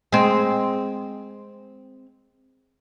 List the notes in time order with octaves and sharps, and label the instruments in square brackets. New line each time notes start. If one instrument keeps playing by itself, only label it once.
[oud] G#3 C4